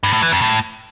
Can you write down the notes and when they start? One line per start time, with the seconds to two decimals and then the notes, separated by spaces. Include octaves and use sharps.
0.03 G2
0.13 A2
0.22 E3
0.32 F2
0.42 A2